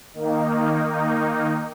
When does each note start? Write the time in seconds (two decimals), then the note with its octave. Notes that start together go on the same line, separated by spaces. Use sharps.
0.13 D#3 A#3 D#4
0.83 D#3 A#3 D#4